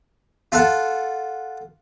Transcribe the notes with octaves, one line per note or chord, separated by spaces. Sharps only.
F4 A4 F#5